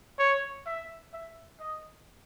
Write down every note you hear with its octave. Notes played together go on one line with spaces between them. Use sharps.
C#5
E5
E5
D#5